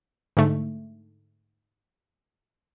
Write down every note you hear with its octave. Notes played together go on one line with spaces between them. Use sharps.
G#2 D3 A3